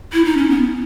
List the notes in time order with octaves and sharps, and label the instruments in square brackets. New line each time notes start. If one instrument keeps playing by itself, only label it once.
[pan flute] E4
D#4
C#4
B3